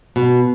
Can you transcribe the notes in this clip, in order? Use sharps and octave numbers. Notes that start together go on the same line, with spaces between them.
B2